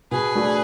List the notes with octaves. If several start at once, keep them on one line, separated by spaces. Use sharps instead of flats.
B2 G#4 B4
A3 D4 F#4